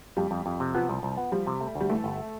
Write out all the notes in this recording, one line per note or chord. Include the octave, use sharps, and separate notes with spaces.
F2 G3
F2
F2
C3
F3 B3
C2
C2
B3
F3 G3
C3
A3
D2
G3
E3 A3
G1